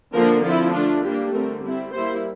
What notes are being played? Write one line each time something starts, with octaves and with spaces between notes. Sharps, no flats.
D3 F3 A#3 D4 A#4
F3 C4 E4 F4
D3 A3 D4 F4
G3 A#3 D4 G4
D3 A3 C4 A#4
G3 C4 E4
G3 A#3 E4 C5